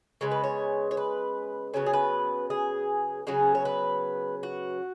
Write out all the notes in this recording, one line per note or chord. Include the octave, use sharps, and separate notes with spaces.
C#3 G#3 B3 C#5
B4
C#5
C#5
B4
C#3 F#3 B3 C#5
G#4
B4
G#4
C#3 F#3 B3 G#4
C#5
B4
F#4